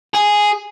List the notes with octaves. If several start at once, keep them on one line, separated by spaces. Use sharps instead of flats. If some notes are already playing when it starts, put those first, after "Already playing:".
G#4